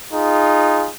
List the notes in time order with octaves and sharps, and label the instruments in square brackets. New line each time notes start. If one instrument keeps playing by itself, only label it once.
[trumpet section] D#4 F4 G#4